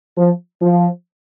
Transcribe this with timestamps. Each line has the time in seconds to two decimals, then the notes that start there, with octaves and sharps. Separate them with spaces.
0.17 F3
0.61 F3